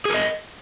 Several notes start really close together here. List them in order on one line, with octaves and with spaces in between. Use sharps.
G#4 A#4 D#5